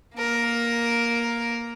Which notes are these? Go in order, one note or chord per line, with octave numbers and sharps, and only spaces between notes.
A#3 A#4